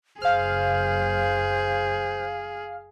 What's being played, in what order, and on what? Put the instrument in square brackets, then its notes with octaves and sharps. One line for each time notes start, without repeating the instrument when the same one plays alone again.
[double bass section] F#1 [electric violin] G#4 [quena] C5 [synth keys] F5 F6